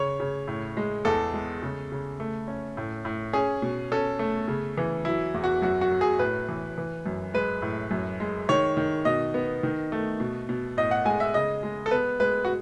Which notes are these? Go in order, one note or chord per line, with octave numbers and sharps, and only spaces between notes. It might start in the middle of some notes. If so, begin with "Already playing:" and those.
Already playing: C#3 C#5
C#3
A2
G#3
E2 A4
G#3
C#3
C#3
A3
C#4
A2
A2
C#4 G#4
B2
C#4 A4
A3
C#3
E3
F#3 E4
E2
F#4
F#2 F#4
F#4
F#3
G#4
A2 B4
E3
E3
F#2
G#3 B4
A2
F#2
G#3
D#3 C#5
D#3
B2 D#5
B3
D#3
A3
B2
B2
A2 D#5
F#5
G#3 G#5
E5
C#3 D#5
G#3
A4
B3 B4
G#3 B4
F#4